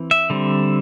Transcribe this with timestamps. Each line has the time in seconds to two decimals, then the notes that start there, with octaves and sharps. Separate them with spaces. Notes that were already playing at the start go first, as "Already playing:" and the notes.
Already playing: E3 C4
0.11 E5
0.30 D3 G3 C4